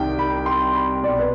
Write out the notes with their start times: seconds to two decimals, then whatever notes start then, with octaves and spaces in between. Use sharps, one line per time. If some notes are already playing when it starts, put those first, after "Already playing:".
Already playing: C2 C3 D#3 G5
0.19 B5
0.46 C6
0.75 B5
1.03 B1 B2 D5
1.19 B4